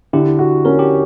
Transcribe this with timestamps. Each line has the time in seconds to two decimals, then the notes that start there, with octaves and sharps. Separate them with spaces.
0.13 D3 E4 G4
0.39 F#4
0.65 C#4 A#4
0.79 G4